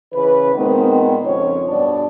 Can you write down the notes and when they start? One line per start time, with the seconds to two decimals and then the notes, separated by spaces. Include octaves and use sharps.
0.13 C#3 E3 B4
0.54 A#2 D#3 G#3 B3 C4
1.24 F2 C#3 F3 C#5
1.68 G2 B2 G3 D4 D5